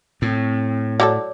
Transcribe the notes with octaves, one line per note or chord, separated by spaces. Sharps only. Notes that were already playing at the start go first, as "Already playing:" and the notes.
A2 C4
F#3 G4 A4 C#5 D5 D6